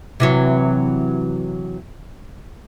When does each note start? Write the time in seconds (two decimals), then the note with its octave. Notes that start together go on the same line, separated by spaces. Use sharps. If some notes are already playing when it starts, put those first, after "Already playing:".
0.20 C3 E3 F#3